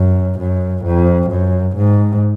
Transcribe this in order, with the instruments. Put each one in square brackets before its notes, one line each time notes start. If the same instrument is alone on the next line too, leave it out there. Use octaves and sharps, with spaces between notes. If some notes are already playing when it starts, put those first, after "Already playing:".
Already playing: [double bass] F#2
F#2
F2
F#2
G#2